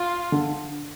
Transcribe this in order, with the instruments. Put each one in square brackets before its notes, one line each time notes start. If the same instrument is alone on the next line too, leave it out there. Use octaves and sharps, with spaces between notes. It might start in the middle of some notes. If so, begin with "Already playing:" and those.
Already playing: [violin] F4
[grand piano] D3